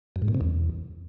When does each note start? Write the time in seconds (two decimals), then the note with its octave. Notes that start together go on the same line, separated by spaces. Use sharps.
0.16 F#2
0.22 G#2
0.28 A#2
0.35 C3
0.41 E2